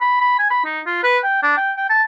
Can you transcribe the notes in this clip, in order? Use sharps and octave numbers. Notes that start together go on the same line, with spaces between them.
B5
B5
G#5
B5
D#4
F4
B4
G5
D4
G5
G5
A5